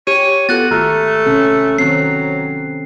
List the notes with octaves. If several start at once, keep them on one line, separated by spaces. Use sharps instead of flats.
G4 C#5 D#7
B3 F4 F#4 A4 F#6 A6
G#1 A3 A#5 F6
C3 C#4 A4
D#3 F#3 C4 C7